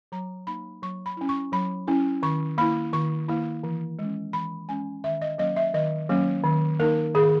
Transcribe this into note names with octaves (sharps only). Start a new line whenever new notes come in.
F#3 A#5
A#3 D#4 B5
F#3 C#6
B5
C#4 E4
C#6
F#3 B5
C#4 E4
D#3 C#6
A#3 E4 B5
D#3 C#6
A#3 E4
E3
G#3 C#4
E3 B5
G#3 C#4 G#5
D#3 E5
D#5
F#3 A#3 C#4 D#5
E5
D#3 D#5
F#3 A#3 C#4
D#3
A#3 D#4 A#4
D#3 G#4